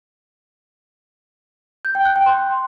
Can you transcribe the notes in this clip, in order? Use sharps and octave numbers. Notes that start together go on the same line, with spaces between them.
G6
G5
F#6
G5
C6